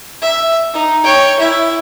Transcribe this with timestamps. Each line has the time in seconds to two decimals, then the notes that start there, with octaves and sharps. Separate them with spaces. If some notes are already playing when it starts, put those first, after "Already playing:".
0.22 E5
0.73 D#4
1.04 C#5 G5
1.39 E4 E5